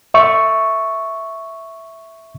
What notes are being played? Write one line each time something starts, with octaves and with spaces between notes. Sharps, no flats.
E5 C#6